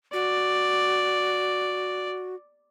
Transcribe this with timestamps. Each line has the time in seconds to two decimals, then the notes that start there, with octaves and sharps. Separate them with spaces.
0.13 F#4 D5